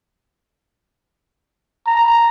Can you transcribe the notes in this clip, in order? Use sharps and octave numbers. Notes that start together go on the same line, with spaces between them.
A#5